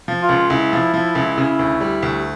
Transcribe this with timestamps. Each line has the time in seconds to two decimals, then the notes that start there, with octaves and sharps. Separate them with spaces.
0.08 F3
0.22 F4
0.29 C#2
0.50 C#2 E4
0.73 F3
0.94 F3
1.15 C#2
1.38 C#3
1.59 D2
1.81 G3
2.02 D2